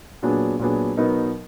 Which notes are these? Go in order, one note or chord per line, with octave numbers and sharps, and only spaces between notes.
A#2 F#3 B3 D4 G#4
A#2 F#3 B3 D4 G#4
B2 F#3 B3 D#4 A#4